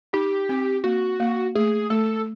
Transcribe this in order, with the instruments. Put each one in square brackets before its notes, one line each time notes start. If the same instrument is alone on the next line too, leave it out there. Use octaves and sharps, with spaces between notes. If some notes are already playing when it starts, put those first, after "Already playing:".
[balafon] D#4 [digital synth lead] G4
[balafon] C4
[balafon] A#3 [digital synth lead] F#4
[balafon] A#3
[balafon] A3 [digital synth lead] G#4
[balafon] A3 [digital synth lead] A4